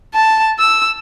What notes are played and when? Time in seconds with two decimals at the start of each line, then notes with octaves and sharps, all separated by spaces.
0.14 A5
0.59 E6